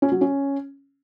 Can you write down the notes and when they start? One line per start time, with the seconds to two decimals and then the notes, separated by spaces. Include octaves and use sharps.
0.02 C#4
0.12 F#3
0.21 C#4